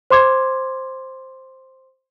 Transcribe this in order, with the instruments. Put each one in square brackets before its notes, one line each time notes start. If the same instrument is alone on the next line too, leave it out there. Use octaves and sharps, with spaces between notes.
[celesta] C5 C6 D6 G#6